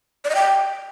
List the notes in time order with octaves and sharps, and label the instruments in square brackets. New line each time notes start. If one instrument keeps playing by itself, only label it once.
[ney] D5
D#5
G5